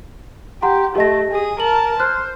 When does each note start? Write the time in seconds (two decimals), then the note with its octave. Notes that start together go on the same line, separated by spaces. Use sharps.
0.62 G4 F#5 A#5 C6
0.96 A3 G4 D#5 A#6
1.31 G#4 D#6
1.60 A#4 A5 F#7
2.00 C5 F6 F#6